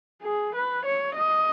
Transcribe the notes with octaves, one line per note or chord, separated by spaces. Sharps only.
G#4
B4
C#5
D#5